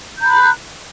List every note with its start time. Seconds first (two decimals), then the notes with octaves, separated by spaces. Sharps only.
0.18 G6
0.21 A#5
0.25 B5
0.29 F#6